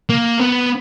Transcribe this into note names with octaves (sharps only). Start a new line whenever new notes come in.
A#3
B3